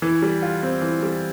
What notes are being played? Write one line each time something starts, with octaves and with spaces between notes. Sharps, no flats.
E3
G3
F4
C4
E3
G3